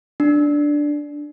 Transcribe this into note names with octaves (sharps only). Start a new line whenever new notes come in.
D4